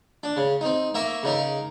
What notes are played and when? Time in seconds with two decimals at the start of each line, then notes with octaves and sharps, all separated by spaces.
0.23 D4
0.37 C#3
0.61 C4 D#4
0.94 A#3 E5 A#5 C#6
1.23 C#3 D#4 A#4